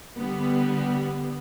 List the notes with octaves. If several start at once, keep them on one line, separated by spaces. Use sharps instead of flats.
D3 G3 B3